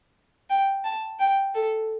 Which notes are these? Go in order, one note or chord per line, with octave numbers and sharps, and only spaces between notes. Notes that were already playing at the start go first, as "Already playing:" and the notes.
G5
A5
G5
A4